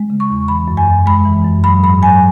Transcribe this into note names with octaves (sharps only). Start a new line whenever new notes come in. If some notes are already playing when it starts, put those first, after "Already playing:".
Already playing: G#3
C#3
C#6
E2
E3 B5
F#2
G#5
F#2
G#3 B5
E3
F#2
F#3 B5
G#2 B5
F#3 G#5